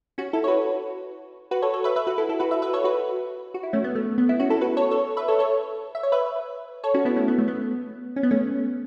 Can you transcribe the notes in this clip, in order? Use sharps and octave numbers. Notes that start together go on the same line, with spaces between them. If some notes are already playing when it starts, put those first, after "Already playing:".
C#4 F#4
E4 A4
C#5
F#4 B4
F#4 B4
A4 C#5
A4 C#5
B4 E5
B4 E5
F#4 B4
E4 A4
E4 A4
F#4 B4
B4 E5
B4 E5
A4 C#5
F#4 B4
F#4
E4
A3 C#4
B3
A3
B3
B3 E4
C#4 F#4
E4 A4
F#4 B4
A4 C#5
A4 C#5
B4 E5
A4 C#5
A4 C#5
E5
C#5
B4 E5
A4 C#5
C#4 F#4
B3 E4
A3 C#4
B3
A3
B3
C#4
B3
A3 C#4